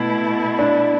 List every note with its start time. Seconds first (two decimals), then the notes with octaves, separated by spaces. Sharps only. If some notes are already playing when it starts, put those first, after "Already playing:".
Already playing: B2 A3 E4
0.59 D4